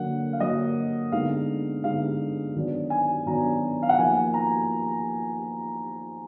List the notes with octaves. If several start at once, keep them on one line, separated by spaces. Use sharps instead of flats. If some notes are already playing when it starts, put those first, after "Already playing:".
Already playing: D3 F#3 A#3 F#5
F5
D3 F#3 A#3 D#5
D3 G#3 B3 D#4 F5
D3 G#3 B3 D#4 F5
D#3 F#3 B3 D4
G#5
D#3 F#3 B3 D4 A#5
F5
F#5
F3 A#3 D#4 G#5
A#5